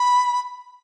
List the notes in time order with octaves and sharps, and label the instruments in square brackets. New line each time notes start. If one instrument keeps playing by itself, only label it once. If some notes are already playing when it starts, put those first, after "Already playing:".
Already playing: [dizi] B5